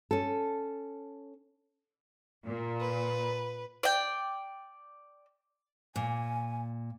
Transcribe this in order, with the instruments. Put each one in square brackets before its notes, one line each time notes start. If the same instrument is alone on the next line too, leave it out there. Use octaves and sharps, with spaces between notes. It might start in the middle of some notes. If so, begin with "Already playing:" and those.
[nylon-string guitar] C#4 A4
[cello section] A#2
[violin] B4
[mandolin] D5 G5
[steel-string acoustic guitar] A#2 [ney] G#5